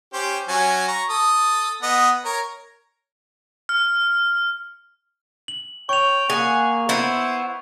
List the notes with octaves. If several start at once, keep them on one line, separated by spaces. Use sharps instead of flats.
C#4 G4 C5
F#3 C#4 G#5
A#5 C#6
A4 D#6
B3 D#5
A#4 C#5
F6
F#7
C#5 G5 C#6 F7
A#3 G#4 F#5
B3 E4 C5